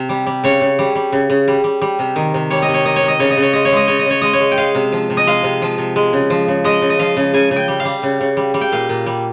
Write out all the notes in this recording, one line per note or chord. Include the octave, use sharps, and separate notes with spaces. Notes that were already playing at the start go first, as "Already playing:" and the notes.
Already playing: C3
G3
G3
C#3 C#5
C#3
G3
G3
C#3
C#3
G3
G3
G3
C3
D#3
C3
G3 C#5
D#5
C3
C#5
D#3 D#5
C#5
C3
D#5
C#3 C#5
D#5
C#3
C#5
G#3 D#5
C#5
G#3 D#5
C#3 C#5
D#5
C#3 C#5
G#3 D#5
C#5
G#3
G5
G#3 F5
C3
F3
C3
D#5
G#3 F5
C3
F3
C3
G#3
C#3
F3
C#3
G#3 D#5
C#3
D#5
F3 F5
C#3
C#3 G#5
C#3 G#5
G5
G3
F5
G3
C#3
C#3
G3
G3
G5
A#2 F5
A#2
G3